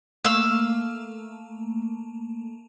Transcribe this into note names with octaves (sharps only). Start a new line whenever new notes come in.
A3 A#3 F5 E6